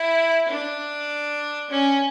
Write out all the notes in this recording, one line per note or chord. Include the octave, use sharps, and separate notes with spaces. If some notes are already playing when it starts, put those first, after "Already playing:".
Already playing: E4
D4
C#4